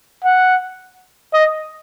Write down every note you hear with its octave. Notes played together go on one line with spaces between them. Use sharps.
F#5
D#5